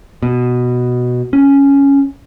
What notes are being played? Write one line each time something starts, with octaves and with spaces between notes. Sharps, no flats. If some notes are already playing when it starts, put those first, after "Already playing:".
B2
C#4